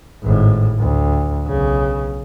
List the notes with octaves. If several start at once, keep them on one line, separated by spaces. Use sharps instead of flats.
G#1 A2
D2
B1 C#3